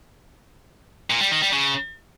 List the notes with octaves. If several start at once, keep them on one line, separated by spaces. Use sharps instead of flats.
A#2
G3
D#3
G3
C#3